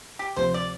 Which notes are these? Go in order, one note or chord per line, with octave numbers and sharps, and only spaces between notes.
G4
D2 C3 F3 C4 C5
D5